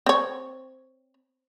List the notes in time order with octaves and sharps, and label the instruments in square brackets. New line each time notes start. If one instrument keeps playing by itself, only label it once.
[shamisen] C4 C#5